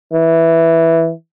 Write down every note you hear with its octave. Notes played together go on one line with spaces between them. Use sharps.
E3